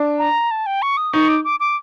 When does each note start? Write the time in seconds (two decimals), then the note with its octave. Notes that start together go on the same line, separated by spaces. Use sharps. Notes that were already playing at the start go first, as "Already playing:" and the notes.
Already playing: D4
0.18 A#5
0.51 A5
0.66 G5
0.82 C#6
0.97 D#6
1.13 D#4 C#6
1.28 D6
1.44 D6
1.60 D6